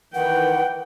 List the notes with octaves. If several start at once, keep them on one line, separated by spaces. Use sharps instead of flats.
D#3 E3 B4 F#5 G5